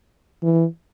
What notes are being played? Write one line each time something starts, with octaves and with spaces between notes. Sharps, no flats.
E3